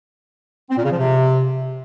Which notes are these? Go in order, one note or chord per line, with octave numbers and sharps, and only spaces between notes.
C4
A#2
C#3
F3
C3